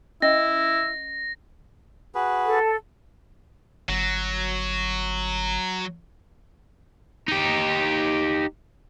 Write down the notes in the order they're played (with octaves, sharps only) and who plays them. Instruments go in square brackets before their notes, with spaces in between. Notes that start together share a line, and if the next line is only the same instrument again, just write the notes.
[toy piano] C#4 D#5 [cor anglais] E4 [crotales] A#6
[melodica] F#4 G#4 B4
[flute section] A4
[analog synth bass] G1 [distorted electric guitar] F#3
[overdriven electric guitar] D#4 G4